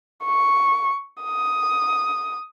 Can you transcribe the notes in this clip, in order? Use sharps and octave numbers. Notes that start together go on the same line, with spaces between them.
C#6
D#6